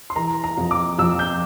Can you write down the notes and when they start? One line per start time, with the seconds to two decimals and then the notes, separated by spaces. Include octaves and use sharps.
0.10 C6
0.16 E3 A#5
0.44 A#5
0.57 F2
0.71 D6
0.99 F2 E6
1.19 G6